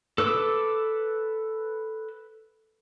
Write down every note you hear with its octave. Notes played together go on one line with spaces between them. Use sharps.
A4 B4 D6 E6